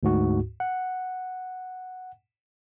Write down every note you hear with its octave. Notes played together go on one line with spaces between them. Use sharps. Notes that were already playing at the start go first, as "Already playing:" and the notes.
D2 G#2 F#4
F#5